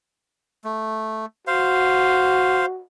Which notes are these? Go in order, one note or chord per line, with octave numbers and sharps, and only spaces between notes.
A3
F#4 C5 F5